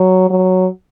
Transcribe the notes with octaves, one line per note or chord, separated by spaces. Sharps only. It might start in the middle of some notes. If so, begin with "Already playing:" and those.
Already playing: F#3
F#3